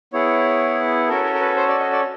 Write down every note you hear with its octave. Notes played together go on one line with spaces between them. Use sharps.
B3 E4 G#4 C#5
C#4 F#4 A4 A#4
A#4
A#4
B4
C5
D5
D#5
D5